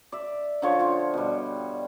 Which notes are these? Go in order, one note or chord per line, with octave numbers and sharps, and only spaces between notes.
D5 E5
D3 F3 C#5
F4 G5
B2 G3